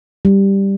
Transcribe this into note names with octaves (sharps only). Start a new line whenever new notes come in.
G3